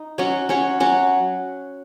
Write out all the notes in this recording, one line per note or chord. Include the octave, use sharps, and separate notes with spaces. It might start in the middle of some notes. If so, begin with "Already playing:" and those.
Already playing: D#4
F#3 C#4 F#4 C#5
F#3 C#4 F#4 C#5
F#3 C#4 F#4 C#5